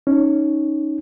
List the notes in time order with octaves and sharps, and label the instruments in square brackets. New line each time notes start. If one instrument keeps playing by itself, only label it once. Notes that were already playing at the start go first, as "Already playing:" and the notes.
[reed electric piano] C#4 D#4